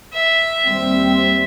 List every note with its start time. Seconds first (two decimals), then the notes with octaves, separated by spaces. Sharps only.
0.14 E5
0.65 D#2 G3 C4